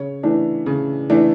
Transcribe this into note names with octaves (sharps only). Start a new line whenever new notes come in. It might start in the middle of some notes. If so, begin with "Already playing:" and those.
Already playing: C#3 C#5
E3 A3 D4
C#3
E3 A3 D4